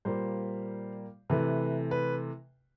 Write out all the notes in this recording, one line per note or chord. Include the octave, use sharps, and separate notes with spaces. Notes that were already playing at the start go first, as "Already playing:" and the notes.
A#2 G3 A#3 C5
C3 E3 A3 B4
B4